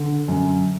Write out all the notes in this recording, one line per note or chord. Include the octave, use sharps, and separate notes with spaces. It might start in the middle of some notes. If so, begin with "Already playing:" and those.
Already playing: D3
F#2